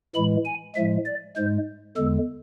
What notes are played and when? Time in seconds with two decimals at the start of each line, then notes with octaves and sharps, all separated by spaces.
0.15 A2 E3 G#3 B5
0.46 G#5
0.76 A2 F3 G#3 E5
1.06 D5
1.36 G#2 G#3 C5
1.96 E2 D3 G#3 A4